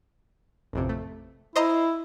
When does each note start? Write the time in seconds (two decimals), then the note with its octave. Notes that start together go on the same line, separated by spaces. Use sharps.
0.73 A1 F2 C3
0.89 A3
1.56 E4 C5 D#5 A#5